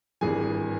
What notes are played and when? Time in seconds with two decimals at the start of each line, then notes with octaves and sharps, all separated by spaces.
0.21 G#1 G2 E3 G#4 G#5